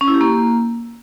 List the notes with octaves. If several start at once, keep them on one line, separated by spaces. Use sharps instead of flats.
C#4
E4
G4
A#3